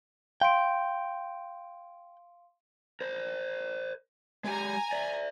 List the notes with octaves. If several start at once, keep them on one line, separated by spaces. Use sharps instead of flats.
F5 G5 C6 D7
A#4 C5
G#3 G4 G#5 A#5
D5 E5